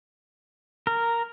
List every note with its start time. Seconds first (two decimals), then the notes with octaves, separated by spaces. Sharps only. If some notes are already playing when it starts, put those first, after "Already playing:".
0.87 A#4